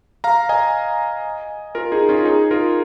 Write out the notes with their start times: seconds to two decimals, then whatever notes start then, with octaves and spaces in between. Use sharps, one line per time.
0.24 F5 A#5
0.49 D#5 G#5
1.75 F4 A#4
1.92 D#4 G#4
2.09 C#4 F4
2.25 D#4 G#4
2.51 F4 A#4